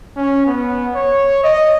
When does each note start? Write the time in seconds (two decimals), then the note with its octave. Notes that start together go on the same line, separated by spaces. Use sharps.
0.17 C#4
0.46 B3
0.95 C#5
1.44 D#5